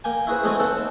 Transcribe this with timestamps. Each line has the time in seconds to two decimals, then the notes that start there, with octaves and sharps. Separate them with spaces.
0.04 A#3 G5 G#5
0.27 E4 F#4 G#4 B4 C5
0.44 G#3 A3 B3 C4 F#4 G#4
0.59 D#2 C4 A4 F#5